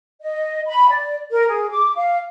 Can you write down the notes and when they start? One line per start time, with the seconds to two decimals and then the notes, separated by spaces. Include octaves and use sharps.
0.21 D#5
0.67 B5
0.89 D5
1.31 A#4
1.47 G#4
1.70 D6
1.96 F5